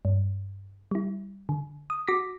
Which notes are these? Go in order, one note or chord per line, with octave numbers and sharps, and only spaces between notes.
G2
G3 E4
D3
D#6
F#4 D6 A#6 B6